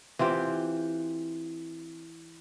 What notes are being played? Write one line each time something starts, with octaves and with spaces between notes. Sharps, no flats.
E3 C4 F4 G4